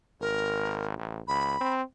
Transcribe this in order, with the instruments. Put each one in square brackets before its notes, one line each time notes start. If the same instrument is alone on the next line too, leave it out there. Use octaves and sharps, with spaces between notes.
[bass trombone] G#1 [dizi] A#4
[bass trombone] A1
[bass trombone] C#2 [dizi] B5
[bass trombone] C4